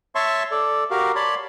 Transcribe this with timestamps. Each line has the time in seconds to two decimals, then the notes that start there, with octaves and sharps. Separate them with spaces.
0.15 C#5 E5 A5 C6 C#6
0.51 A4 D5
0.91 F#4 G4 A#4 F5
1.16 C#5 D5 A5 B5 C6